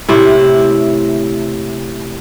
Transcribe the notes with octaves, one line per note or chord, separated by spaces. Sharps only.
A2 C3 E4